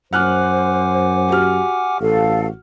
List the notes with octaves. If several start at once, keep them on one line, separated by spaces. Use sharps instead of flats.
F#2 C5 F#5 G#5 D6 F6 F#6
F#4 G4 F6
A1 A4 F5